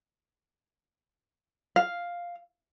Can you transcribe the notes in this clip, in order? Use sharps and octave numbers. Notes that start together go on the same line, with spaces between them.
F5